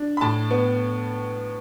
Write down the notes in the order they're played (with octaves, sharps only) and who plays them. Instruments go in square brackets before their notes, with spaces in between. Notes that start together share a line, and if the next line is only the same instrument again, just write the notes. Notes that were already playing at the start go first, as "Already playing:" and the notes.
Already playing: [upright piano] D4
B5
A2 A5
B3